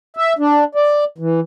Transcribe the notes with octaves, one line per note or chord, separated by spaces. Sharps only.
E5
D4
D5
E3